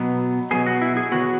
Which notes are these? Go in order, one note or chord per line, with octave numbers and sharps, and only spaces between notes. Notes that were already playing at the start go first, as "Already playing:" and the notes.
Already playing: B2 F#3 B3
B2 F#3 B3 G#4
F#4
E4
G#4
D#3 F#3 B3 F#4